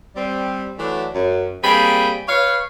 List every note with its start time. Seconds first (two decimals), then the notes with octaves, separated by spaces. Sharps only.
0.16 G3 C4
0.79 E3 F#3 A3 D4
1.15 F#2
1.63 G3 A#3 C4 G#4 G5 B5
2.28 B4 C#5 F5